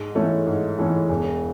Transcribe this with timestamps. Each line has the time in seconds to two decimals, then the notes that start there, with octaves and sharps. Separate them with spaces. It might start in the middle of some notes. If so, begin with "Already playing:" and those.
Already playing: G#2
0.15 E3 A3 C#4
0.47 G#2
0.79 E3 A3 C#4
1.09 E1